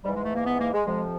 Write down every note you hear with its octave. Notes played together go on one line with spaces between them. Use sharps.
G#2 E3 G3
G#3
A3
A#3
B3
A#3
G#3
F2 C3 F3 G#3